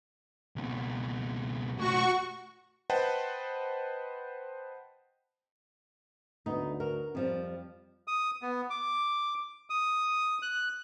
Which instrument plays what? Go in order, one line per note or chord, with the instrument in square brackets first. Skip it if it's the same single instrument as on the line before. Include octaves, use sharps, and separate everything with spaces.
[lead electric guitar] C#2 B2
[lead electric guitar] B1 A3 [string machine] F#4 C#6
[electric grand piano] B4 C5 D#5 F#5 G5 A5
[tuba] D2 [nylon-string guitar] B3 D#4
[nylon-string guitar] F#4 A#4
[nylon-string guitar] F2 F3 G3 [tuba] C4
[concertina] D#6
B3
D6
D#6
F#6